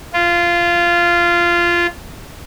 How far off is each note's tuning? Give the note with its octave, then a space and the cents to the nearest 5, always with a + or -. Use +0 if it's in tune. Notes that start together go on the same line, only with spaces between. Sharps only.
F4 -15